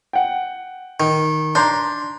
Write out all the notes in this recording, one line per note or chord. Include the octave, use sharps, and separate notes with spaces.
F#5 G5
D#3
D4 A#5 C6 G6